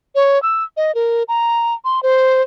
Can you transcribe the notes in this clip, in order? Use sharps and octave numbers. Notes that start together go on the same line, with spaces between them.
C#5
E6
D#5
A#4
A#5
C6
C5